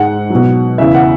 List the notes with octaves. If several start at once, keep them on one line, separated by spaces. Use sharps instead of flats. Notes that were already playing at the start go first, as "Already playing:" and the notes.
Already playing: G#2 G#3 F#5
B2 F#3
E2 C#3 E3 E5
F#5